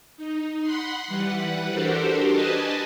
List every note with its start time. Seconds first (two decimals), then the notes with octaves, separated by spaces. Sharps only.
0.17 D#4
0.61 F#5 B5 C6
1.07 E3 G3 B4 F#5
1.71 D4 F#4 G4 A4 A#4 C5
2.33 B4 D#5 G#5 A5